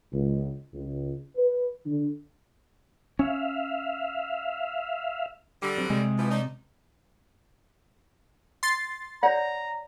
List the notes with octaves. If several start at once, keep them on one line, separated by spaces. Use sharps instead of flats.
C#2
C#2
B4
D3
C#4 E5 F5
D3 G3
F#3 C4 D4
C3 G#3
E3 F3
F3 D4 D#4
C6 A6 C7
C#5 D5 F#5 A#5